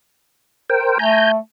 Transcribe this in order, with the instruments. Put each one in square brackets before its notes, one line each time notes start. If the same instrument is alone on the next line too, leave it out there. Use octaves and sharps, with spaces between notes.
[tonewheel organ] A#4 C5 G5
[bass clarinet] A3 [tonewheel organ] G#5 A#5 G6